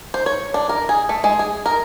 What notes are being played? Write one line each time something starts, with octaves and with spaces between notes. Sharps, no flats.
C5
C#5
D4
A#4
G#4
A3
G#3
G#4
A#4